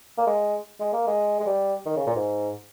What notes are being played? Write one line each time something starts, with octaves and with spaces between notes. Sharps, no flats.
A#3
G#3
G#3
A#3
G#3
G#3
G3
D#3
C#3
A#2
G#2